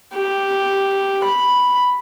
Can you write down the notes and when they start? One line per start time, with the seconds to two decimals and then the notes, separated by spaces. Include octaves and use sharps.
0.13 G4
1.24 B5